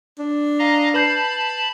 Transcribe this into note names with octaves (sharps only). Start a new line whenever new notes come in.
D4
D#5 F5 A#5
B4 A5 B5 G6 C7